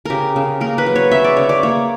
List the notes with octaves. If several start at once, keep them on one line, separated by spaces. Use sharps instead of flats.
C#3 G4 A#4
C#3
A#3 A#4
B4
F#3
C#5
C#3 E5
D5
C#3 C#5
D5
A#3 C#5